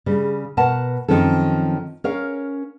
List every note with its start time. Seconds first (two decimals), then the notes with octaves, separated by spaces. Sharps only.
0.06 C#3 G3
0.57 B2 A#4 B4 F#5 A5
1.08 F#2 D#3 F3 C4 C#4 A4
2.04 C#4 A#4 C#5 F5